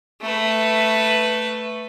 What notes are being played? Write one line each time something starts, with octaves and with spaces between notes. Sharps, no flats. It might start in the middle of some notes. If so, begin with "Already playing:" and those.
A3 B4